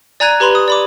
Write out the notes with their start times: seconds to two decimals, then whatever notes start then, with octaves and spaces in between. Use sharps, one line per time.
0.20 D5 G#5 A#5 F#6 G#6 D#7
0.40 G4 B4 B5 C6 F7
0.55 D#6
0.68 D5 B5 D6